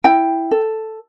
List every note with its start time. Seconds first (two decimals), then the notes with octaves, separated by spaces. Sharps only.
0.04 E4 G5
0.51 A4